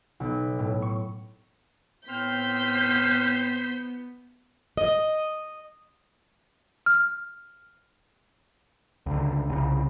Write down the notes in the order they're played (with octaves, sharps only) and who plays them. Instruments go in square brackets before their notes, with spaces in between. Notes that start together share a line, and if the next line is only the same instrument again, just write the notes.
[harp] B1
A2
C#6
[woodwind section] A2 C4 F6 [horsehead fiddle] B3 [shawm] C5 [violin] G6 B6
[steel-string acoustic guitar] D#5
[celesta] F6
[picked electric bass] C#2 D3
C2 C#3